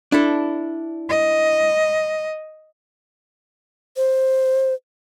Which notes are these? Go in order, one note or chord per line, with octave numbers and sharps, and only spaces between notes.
D4 E4 A4
D#5
C5